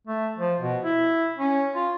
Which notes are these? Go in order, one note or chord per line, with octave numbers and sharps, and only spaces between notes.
A3
F3
B2
E4
C#4
F4